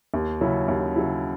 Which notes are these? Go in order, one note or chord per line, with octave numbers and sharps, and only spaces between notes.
D#2
C#3 F#3 C#4 E4
D#2
C#3 F#3 C#4 E4